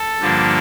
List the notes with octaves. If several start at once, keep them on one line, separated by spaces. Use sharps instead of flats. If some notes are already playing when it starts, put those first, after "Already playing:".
Already playing: A4
G2 D3 F3 A#3